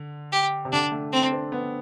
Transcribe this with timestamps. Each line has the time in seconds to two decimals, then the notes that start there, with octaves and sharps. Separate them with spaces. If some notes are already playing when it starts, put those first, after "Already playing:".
Already playing: D3
0.32 G4
0.65 C3
0.72 D3 D4
0.92 A3
1.13 C4
1.22 D4
1.32 C4
1.52 B3